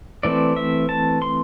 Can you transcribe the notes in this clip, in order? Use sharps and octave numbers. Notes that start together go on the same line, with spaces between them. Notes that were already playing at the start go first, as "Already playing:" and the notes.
E3 A3 C4 D5
E5
A5
C6